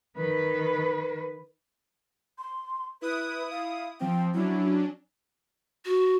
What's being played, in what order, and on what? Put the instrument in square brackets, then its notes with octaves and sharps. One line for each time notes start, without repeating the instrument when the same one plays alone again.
[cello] D#3 B4
[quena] C6
[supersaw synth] E4 D#6 [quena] B4
[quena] F5
[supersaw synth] F3 C4 [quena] G5
[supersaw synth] F#3 C#4 D4 [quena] E4
[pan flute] F#4